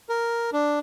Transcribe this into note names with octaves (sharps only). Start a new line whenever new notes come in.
A#4
D4